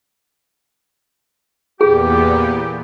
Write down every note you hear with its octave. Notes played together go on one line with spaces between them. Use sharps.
E2 A#2 B3 G4 G#4